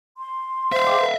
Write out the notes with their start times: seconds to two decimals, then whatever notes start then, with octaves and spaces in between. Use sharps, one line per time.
0.18 C6
0.72 C5 E5 F5
0.87 G#4 G5 D6
0.99 A4 B4